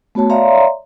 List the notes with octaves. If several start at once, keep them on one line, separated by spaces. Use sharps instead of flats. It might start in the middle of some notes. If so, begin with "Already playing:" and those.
A3 B3 F#4 C#5 A5
C#5 D5 E5 F5 A#5 C6